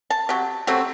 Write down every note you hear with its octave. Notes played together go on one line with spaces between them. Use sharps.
A5
C3 F#3
C3 F#3 A3 C4